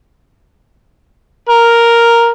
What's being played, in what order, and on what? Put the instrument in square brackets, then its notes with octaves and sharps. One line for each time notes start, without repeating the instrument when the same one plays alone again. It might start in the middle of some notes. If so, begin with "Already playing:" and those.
[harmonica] A#4